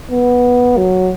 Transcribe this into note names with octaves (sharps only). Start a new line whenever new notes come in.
B3
F#3